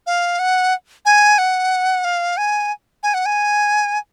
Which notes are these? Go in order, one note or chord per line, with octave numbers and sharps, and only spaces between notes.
F5
F#5
G#5
F#5
F5
G#5
G#5
F#5
G#5